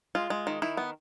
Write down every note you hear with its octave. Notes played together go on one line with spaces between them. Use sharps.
G#3 F4
G#3
D#3
D#3 E4
B3